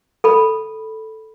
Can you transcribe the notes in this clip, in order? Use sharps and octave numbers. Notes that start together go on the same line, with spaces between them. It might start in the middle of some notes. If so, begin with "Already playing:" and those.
A4 B5